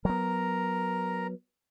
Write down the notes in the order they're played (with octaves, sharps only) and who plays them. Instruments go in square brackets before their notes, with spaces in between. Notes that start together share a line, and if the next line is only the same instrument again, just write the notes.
[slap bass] F#3 B3 [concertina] A#4 A#5